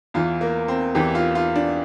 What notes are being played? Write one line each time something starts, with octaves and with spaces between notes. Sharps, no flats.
E2 E3 F4
A#3
C4
E2 E3 G4
F4
F4
D4